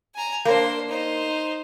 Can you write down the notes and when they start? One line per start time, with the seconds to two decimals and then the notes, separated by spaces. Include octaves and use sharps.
0.15 G#5 A#5
0.45 A#3 D4 C5
0.88 D#4 C5